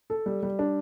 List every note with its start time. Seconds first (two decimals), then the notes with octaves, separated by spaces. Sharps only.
0.10 A4
0.26 G3
0.43 G3
0.59 D4